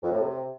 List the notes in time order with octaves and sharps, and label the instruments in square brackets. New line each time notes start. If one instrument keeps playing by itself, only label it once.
[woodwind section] F2
A2
C3